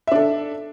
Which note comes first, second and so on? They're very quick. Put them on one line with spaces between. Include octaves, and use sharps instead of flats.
E5 D4 A4